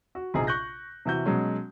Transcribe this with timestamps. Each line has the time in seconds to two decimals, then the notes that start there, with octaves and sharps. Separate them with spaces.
0.15 F#4
0.34 A#1 C3 D#4 G#4 A#5
0.47 C#6 F#6 G6 A#6
1.06 C3 E3 F#4 G6
1.26 B2 F#3 G#3 C#4